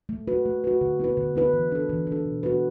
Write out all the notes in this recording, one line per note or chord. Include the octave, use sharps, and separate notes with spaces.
A3
F#4 B4
A3
F#4 B4
D3
B3 E4 B4
D3
B3 E4 B4
E3
D4 A4
E3
D4 A4
B2
B3 F#4 B4